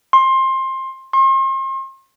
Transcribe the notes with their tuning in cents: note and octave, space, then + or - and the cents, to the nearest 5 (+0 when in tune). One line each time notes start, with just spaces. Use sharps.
C6 +20
C6 +40